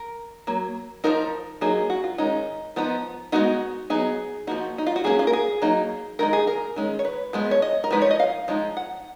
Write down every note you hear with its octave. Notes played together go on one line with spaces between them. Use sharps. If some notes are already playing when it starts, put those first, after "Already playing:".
Already playing: A#4
F#3 A#3
F3 G#3 D#4 A#4
F#3 A#3 D#4 G#4
F#4
F4
D#3 G#3 C#4 D#4
F3 B3 D#4
G#3 B3 D#4 F#4
F#3 B3 D#4 G#4
F3 A#3 D#4 F#4
D#4
F4
F#4
F#3 A#3 C#4 G#4
F4
A#4
G#4
F#3 A#3 D#4
D#3 G#3 D#4 A#4
G#4
A#4
D#3 G#3 C#4
C#5
B4
F3 G#3 B3
C#5
D#5
A#4
F3 G#3 D#4 B4
C#5
D#5
F5
F3 G#3 D#4
F#5